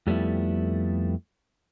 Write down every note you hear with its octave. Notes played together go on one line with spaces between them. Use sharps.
F2 G3 A3 B3 E4